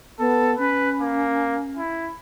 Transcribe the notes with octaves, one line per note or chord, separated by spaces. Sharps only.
B3 A4
C#4 B4
A#3
E4